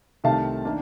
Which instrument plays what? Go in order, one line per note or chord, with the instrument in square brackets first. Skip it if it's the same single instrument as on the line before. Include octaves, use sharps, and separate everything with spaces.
[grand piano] C2 C3 D#3 A3 F5 A5
D#3 A#3 D4